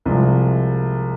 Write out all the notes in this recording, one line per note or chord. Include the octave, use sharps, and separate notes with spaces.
C2 C3 F3 G#3